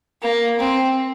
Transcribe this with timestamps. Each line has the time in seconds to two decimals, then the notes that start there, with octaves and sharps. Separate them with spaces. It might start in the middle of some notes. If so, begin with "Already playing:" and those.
0.22 A#3
0.59 C4